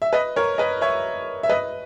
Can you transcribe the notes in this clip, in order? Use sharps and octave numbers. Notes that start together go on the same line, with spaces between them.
E5
B4 D#5
A#4 C#5
B4 D#5
C#5 E5
E5
B4 D#5